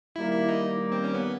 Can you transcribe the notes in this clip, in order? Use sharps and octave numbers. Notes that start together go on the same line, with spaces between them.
D#3 G3 A#3 E4
E4
D#4
C4
C#4
B3